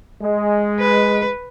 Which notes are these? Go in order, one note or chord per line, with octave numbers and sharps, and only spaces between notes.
G#3
B4